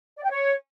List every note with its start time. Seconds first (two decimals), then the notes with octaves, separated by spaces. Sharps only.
0.17 D5
0.24 G5
0.30 C#5